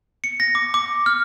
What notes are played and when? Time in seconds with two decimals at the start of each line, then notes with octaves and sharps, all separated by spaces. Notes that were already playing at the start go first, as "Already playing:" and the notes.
0.24 C#7
0.40 A#6
0.55 D6
0.74 D6
1.06 F6